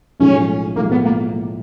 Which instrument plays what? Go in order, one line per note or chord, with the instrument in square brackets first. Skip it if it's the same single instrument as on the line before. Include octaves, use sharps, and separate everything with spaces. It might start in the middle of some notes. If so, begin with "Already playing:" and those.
[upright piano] B1 A2 F3 G#3 [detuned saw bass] C#4
[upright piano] B1 A2 F3 G#3 [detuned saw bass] A#3
[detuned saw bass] B3
A#3